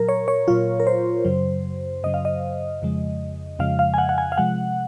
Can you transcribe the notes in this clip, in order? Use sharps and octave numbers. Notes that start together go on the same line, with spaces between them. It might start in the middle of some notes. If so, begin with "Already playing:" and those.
Already playing: A#2 F#3 A#4
C#5
C#5
A#2 F#3 F4
A#4
C5
F#2 C#3 F#3
F#2 C#3 F#3 D#5
F5
D#5
F2 C#3 F3 G#3
F2 C#3 F3 G#3 F5
F5
G#5
F#5
F#5
G#5
F5
C3 F3 G#3 F#5